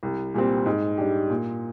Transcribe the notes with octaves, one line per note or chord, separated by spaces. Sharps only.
C2
A#2 G3 C4
G#2
G3 D4 G4
A#2